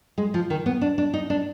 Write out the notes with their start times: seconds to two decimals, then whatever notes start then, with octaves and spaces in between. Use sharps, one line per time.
0.18 G#3
0.34 F3
0.50 D#3
0.66 B3
0.81 D4
0.98 D4
1.13 D#4
1.30 D4